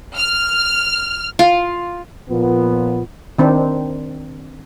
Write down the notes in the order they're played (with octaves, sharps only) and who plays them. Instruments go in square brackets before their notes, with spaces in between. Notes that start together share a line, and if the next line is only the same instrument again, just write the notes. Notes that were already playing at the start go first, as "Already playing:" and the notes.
[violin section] F6
[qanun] F4
[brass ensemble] A#2 F3 B3
[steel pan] D#3 C4 D4